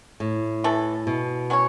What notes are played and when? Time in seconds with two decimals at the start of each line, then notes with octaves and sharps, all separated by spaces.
0.20 A2
0.64 E3 A3 E4 A4
1.07 B2
1.50 F#3 C#4 F#4 C#5